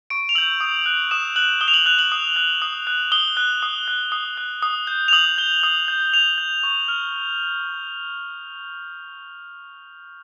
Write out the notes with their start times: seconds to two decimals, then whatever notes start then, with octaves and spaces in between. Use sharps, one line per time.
0.10 C#6 D7
0.29 F7
0.35 E6 G6 F#7
0.61 D#6
0.86 F#6
1.11 D#6 E7
1.36 F#6 F#7
1.61 D#6 G7
1.68 F7
1.74 F#7
1.86 F#6 F7
1.99 F#7
2.12 D#6
2.36 F#6
2.62 D#6
2.87 F#6
3.12 D#6 G7
3.37 F#6
3.63 D#6
3.88 F#6
4.12 D#6
4.37 F#6
4.62 D#6
4.87 G6
5.08 F7
5.13 D#6 F#7
5.38 G6 G7
5.63 D#6
5.88 G6
6.13 D#6 F7
6.38 G6
6.63 C#6
6.88 F6